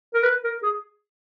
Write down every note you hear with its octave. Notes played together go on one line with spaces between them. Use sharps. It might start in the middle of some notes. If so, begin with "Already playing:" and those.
A#4
B4
A#4
G#4